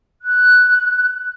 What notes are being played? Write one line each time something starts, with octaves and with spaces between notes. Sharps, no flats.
F#6